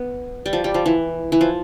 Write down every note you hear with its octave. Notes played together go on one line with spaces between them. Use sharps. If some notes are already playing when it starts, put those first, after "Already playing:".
Already playing: B3
G3
F3
G3
F3
E3
E3
F3